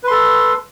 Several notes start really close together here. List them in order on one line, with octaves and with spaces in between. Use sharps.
B4 C6 A4